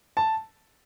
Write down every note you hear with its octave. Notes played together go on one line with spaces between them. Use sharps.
A5